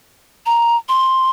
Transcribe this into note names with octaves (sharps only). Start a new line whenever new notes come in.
A#5
C6